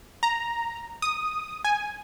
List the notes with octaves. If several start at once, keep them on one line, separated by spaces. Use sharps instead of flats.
A#5
D#6
G#5